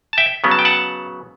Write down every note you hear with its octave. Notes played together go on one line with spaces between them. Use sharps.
A5
E5 G5
C#3 F#3 B3
A5
G5
F#5 A5